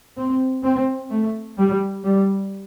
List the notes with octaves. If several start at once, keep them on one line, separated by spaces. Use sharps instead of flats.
C4
C4
A3
G3
G3